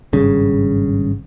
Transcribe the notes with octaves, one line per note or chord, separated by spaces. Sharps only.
G#1 G2 C#3